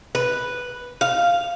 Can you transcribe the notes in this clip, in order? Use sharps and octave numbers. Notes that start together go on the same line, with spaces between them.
B4
F5